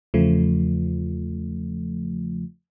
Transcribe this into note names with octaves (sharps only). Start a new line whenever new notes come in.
E2 C#3 F3 A3